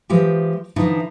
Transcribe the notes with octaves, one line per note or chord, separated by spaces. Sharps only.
E3 F3 G#3 G4
D3 E3 F3 D#4 E4